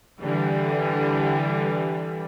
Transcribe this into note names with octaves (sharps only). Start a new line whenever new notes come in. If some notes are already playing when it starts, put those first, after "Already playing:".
D3 E3 G3